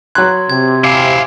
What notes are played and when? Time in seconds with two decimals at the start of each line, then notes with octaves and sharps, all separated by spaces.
0.15 F#3 C6 F#6 G#6
0.50 C3 G#6
0.84 E4 F5 G#5 D6